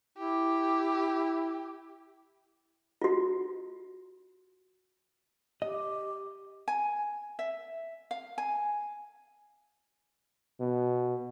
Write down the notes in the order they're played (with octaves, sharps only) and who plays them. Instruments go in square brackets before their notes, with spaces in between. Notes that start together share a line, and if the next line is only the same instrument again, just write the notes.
[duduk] E4 [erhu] G4
[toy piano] F4 F#4
[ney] G4 [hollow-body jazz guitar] D#5
[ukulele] G#5
E5
F5
G#5
[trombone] B2